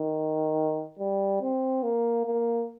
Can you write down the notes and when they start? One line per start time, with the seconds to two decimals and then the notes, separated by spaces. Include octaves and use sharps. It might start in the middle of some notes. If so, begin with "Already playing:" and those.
Already playing: D#3
0.99 G3
1.42 C4
1.83 A#3
2.26 A#3